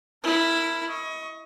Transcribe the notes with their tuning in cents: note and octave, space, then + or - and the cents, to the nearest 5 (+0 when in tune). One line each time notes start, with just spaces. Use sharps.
E4 +0 A#4 -25
D#5 +30 C#6 +0